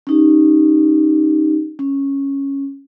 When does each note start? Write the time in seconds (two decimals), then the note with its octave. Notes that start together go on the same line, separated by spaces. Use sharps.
0.07 C#4 D#4 G4
1.79 C#4